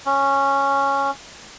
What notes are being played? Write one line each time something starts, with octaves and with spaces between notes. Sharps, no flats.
C#4